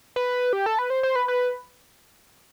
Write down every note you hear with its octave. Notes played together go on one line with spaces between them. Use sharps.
B4
G4
A4
B4
C5
C5
B4
B4